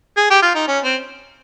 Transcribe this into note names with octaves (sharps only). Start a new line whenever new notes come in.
G#4
G4
F4
D#4
C#4
C4